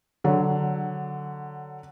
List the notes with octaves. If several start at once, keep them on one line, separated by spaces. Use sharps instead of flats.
D3 F#3